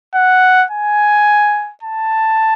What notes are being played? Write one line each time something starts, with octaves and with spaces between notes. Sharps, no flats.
F#5
G#5
A5